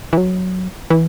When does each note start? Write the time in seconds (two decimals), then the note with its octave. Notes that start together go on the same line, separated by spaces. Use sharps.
0.13 E3
0.17 F#3
0.90 E3